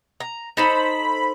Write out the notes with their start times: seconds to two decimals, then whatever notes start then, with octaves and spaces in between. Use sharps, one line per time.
0.20 A#5
0.57 D#4 A4 C5 B5